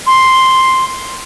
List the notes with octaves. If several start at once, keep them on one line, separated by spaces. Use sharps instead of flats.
C6